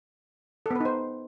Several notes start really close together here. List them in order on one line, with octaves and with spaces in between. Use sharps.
A4 B3 B4 D#4 C5